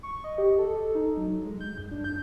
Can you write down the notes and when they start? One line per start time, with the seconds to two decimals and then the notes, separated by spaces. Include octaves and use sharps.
0.03 C#6
0.24 D#5
0.38 G4
0.58 A4
0.95 D#4
1.17 F#3
1.45 G#3
1.61 G6
1.78 F#2
1.92 D4
2.04 G6